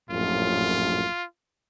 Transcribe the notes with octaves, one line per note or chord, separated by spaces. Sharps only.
A#1 F#2 A2 F4